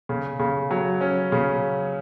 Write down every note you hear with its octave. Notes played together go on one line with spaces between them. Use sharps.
C#3
C#3
F#3
C#4
C#3